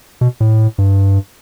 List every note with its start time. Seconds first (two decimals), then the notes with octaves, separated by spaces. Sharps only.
0.21 B2
0.40 A2
0.78 G2